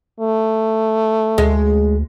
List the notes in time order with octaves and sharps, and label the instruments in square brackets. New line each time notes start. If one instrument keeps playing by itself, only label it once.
[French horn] A3
[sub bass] D2 [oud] G#3